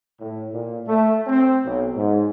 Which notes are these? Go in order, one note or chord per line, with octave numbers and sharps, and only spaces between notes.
A2
A#2
A3
C4
B1
G#2